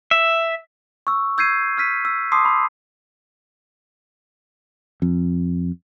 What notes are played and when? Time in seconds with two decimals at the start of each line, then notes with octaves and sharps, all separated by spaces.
0.11 E5
1.07 C#6 E6
1.38 E6 G6 G#6 C7 D#7
1.77 E6 F6 B6 D#7
2.05 E6
2.32 A5 C6 D6 D#6 C7
2.45 B5 D6
5.02 F2